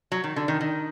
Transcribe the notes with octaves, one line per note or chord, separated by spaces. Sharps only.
F#3
D#3
D3
D#3
D#3